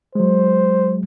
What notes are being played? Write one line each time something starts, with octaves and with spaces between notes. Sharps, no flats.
F#3 G#3 C5